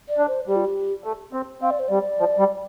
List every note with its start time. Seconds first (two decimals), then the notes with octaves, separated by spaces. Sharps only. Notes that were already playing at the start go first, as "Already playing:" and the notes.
0.09 D5
0.18 D4
0.27 C5
0.47 G3 G4
0.56 F4
0.65 G4
1.04 A3
1.33 C4
1.61 C4 F5
1.70 D5
1.79 C5
1.88 G3 D5
2.19 F3
2.38 G3